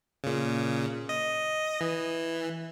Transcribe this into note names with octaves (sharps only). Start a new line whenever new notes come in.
A#2 C#3
D#5
E3